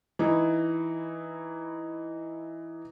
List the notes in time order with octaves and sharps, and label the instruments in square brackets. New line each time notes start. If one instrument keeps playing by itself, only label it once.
[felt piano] E3 D#4 E4